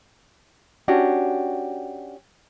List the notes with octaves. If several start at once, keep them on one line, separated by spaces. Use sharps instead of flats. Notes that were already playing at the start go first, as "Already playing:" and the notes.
C#4 D4 F#4 G4